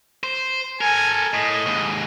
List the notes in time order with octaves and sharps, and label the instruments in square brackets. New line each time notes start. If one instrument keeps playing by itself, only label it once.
[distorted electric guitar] C5
[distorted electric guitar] A4 A#4 [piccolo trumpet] G#5
[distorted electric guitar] A2 [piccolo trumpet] D#5
[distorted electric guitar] D#2 G#2